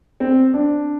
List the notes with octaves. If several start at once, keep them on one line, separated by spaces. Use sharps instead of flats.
C4
D4